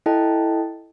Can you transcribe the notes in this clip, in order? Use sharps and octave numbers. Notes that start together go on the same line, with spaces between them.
E4 A4 D#5 G5 A5